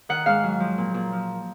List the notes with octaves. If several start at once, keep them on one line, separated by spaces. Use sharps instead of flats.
D#3 F#5
G#2 F5
F#3
F3
A#2
A#2
F3